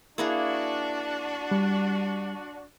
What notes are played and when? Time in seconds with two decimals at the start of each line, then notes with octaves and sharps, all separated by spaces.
0.18 A#3 D4 E4 F#4 G#4
1.51 G3